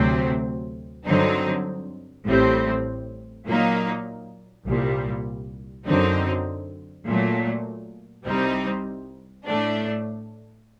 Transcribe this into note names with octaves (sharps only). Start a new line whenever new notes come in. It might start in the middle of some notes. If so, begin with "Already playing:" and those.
Already playing: D2 C3 F#3 C4
G2 D3 F#3 C4 D#4
A1 A2 G3 C4
A#2 F#3 A#3 D#4
C2 A#2 G3
F#2 D3 F#3 C4 D#4
A#2 F#3 A3
C2 C3 G3 C4 D#4
A2 A3 D4